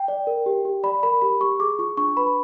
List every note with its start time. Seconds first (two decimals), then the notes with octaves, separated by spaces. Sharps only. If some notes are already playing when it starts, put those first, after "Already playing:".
Already playing: G5
0.08 D5
0.27 A#4
0.46 G4
0.65 G4
0.83 D5 B5
1.03 A#4 B5
1.21 G4 B5
1.41 G4 C#6
1.60 G#4 D6
1.79 F4 C#6
1.97 D4 C#6
2.17 B4 B5